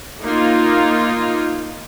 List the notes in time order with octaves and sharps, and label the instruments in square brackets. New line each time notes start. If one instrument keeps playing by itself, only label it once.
[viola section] A#3 D#4 F4